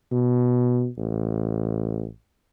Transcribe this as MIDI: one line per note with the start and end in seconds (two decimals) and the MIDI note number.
0.12 0.87 47
0.98 2.05 33